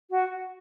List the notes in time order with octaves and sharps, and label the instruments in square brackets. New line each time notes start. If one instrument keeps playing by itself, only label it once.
[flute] F#4